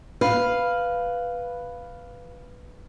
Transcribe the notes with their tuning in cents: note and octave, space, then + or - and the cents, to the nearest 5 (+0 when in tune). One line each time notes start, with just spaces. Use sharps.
B4 +0 F5 +0